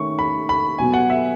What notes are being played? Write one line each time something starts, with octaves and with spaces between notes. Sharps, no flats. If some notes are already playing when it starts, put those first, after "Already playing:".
Already playing: D#3 A3 C#4 C#6
B5
B5
B2 F#3 B3 G#5
F#5
E5